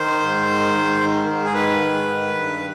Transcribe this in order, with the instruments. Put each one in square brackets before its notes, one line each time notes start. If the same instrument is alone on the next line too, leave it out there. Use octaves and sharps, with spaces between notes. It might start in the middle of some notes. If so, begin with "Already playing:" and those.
Already playing: [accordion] D#3 C5
G#2
D#3
G#2
D#3
G#2
G#4
D#3 B4
G#2
D#3
G2